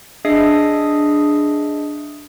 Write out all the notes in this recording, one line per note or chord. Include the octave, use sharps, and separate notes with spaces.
D4 G#4 D#5 E5 D#6 C7